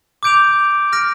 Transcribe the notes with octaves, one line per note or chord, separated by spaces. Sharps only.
D6 G6 D7 F7
F6 A#6 D7